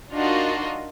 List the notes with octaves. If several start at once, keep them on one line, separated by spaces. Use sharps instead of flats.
D4 D#4 F4 F#4 A#4 D#5